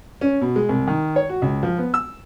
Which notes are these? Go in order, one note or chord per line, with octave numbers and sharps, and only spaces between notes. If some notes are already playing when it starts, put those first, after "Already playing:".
C#4
B2
G#3
C2
D#3
C#5
F#4
C#2
F3
B3
E6